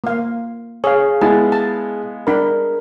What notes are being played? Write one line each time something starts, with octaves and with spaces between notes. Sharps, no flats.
A#3 F5
G#4 C#5 F5
G#3 B3 E4 A5
A5
D4 A#4 B5